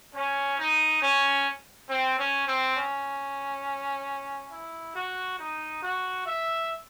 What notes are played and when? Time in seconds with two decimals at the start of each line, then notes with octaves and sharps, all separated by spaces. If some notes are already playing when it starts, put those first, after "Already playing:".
0.15 C#4
0.59 D#4
1.02 C#4
1.90 C4
2.19 C#4
2.48 C4
2.77 C#4
4.51 E4
4.95 F#4
5.39 D#4
5.83 F#4
6.26 E5